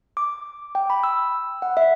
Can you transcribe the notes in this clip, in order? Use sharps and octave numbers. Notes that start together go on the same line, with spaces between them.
D6
G5
B5
E6
F#5
E5